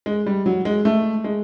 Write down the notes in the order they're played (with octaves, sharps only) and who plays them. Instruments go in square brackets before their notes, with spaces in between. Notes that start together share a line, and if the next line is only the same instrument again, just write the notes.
[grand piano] G#3
G3
F#3
G#3
A3
G#3